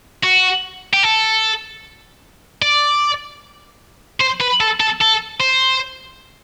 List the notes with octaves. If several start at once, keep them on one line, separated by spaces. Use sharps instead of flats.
F#4
G4
A4
D5
C5
B4
A4
A4
A4
C5